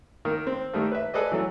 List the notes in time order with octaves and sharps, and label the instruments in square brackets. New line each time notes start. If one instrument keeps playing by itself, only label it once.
[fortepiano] D#3 A#3
C4
D#3 G3 A3 A#3
B4 E5
G#4 A4 B4 D5 D#5
E3 F#3 A4